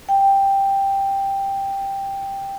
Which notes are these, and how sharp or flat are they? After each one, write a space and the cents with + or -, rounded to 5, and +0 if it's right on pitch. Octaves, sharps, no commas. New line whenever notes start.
G5 +5